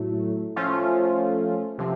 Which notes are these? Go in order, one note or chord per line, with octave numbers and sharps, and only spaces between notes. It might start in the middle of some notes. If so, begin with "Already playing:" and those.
Already playing: A2 F#3 A3
F3 A3 C#4 F4
C3 F3